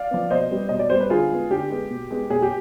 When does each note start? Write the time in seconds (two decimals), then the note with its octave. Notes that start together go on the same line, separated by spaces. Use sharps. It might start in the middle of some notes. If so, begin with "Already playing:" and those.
Already playing: D5 F5
0.11 F3 B3
0.30 B2 C5 D#5
0.51 G3 B3
0.69 B2 D#5
0.79 D5
0.90 G3 B3 C5
1.00 B4
1.10 D3 F4 G#4
1.30 G#3 B3
1.51 D3 G4
1.70 G#3 B3
1.90 B2
2.10 G#3 B3
2.30 B2 G#4
2.42 G4